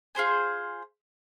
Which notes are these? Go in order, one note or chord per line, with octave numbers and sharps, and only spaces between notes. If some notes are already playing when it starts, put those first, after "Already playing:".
F4 G#4 C5 G#5